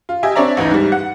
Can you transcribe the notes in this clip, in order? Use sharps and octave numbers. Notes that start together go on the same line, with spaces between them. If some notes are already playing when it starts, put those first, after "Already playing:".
F4
G4 D#5 E5 G#5
C4 D4 C#5 D5 E5 A#5
A1 D2 E3 D#4
G#2 G3
F#5